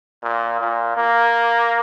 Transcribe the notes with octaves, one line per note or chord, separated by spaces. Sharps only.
A#2
A#2
A#3